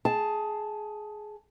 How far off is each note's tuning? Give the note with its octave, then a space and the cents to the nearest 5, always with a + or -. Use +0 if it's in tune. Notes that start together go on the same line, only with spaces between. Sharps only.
G#4 +15 A5 +0